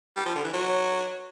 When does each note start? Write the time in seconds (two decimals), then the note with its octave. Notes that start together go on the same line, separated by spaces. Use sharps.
0.16 G3
0.26 F3
0.35 D3
0.44 E3
0.54 F#3